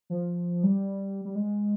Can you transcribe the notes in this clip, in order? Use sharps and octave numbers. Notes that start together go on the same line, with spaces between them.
F3
G3
G3
G#3